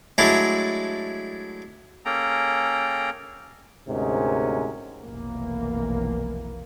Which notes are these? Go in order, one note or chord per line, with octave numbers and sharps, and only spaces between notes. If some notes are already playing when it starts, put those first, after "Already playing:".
F#3 G#3 A3 D4 E4
A#3 C#4 G#4 A4 G5 A#5
D2 G#2 C3 G#3 C#4 A#4
F1 B1 E3 A#3